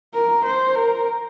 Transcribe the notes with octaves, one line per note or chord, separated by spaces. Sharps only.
A#4
C5
A#4